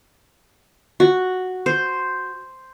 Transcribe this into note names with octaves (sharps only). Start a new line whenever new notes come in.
F#4
C5